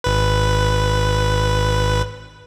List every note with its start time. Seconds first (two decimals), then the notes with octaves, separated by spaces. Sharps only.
0.04 G#1 B4